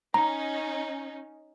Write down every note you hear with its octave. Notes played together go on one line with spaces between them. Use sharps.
C#4 D#4 A#5